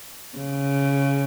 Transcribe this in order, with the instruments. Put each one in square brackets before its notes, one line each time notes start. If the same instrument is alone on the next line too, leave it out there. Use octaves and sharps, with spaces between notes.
[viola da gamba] C#3